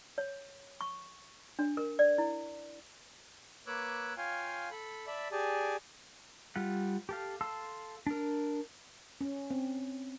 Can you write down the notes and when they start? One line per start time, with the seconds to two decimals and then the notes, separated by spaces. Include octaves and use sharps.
0.18 C#5
0.81 C#6
1.59 D4
1.77 A#4
1.99 D5
2.18 E4
3.67 A#3 B4 C#5 D6 E6 F#6
4.17 F4 C#5 F5 G5 G#5
4.71 A4 B5
5.07 D5 E5 A5 B5
5.32 G4 G#4 D5 G#5 A5
6.56 G3 F4 F#5
7.09 G4 A4 F5
7.41 A4 F5 A5 C6 E6
8.07 D4 A#4
9.21 C#4
9.50 C4